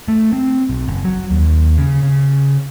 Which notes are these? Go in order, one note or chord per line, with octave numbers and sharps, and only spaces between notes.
A3
C4
B1
F#1
F#3
D#2
C#3
C#3